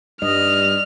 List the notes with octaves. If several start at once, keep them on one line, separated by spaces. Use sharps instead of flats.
G2 G3 D#5 F6